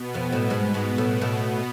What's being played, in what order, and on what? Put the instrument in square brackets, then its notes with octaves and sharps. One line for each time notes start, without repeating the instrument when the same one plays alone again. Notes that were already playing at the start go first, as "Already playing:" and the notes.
Already playing: [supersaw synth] B2 B3
[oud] F2 F3
A2 A3
G#2 G#3
G#2 G#3
A2 A3
A2 A3